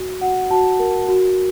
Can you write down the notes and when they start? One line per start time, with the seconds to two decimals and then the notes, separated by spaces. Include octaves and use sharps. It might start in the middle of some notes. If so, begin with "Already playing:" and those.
Already playing: F#4
0.21 F#4 F#5
0.50 F#4 A5
0.79 A#4
1.08 F#4